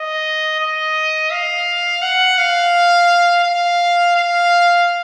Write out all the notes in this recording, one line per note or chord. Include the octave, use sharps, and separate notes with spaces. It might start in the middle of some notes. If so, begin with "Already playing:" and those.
Already playing: D#5
D#5
F5
F#5
F5
F5
F5